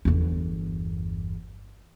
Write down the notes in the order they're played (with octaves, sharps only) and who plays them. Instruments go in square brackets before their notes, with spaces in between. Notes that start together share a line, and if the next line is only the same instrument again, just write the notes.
[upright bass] G1 E2